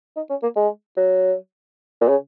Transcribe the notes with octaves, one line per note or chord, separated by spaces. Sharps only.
D#4
C#4
A#3
G#3
F#3
A#2
C#3